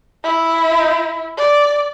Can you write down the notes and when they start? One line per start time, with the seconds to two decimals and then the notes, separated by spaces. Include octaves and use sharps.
0.24 E4
1.37 D5